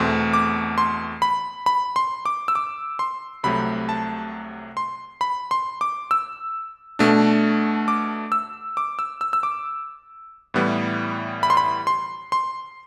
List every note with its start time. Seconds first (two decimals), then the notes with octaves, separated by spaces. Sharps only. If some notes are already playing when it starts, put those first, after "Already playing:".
Already playing: E2 B2 A3 C4 C6
0.33 D6
0.78 C6
1.22 B5
1.66 B5
1.96 C6
2.26 D6
2.48 E6
2.55 D6
2.99 C6
3.43 C2 C3 F#3 A3 B5
3.89 A5
4.77 C6
5.21 B5
5.51 C6
5.81 D6
6.11 E6
6.99 B2 A3 D4
7.88 D6
8.32 E6
8.77 D6
8.99 E6
9.21 E6
9.33 E6
9.43 D6
10.54 A2 E3 G3 B3
11.43 B5
11.50 C6
11.57 B5
11.87 C6
12.32 C6